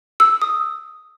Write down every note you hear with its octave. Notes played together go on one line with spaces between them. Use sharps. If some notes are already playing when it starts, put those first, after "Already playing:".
E6
D#6